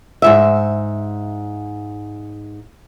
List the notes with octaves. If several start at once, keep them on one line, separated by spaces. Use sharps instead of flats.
G#2 D#3 E5